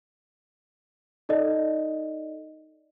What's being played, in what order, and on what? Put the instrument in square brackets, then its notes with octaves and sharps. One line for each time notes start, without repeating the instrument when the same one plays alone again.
[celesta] D#4 A4 D5 D#5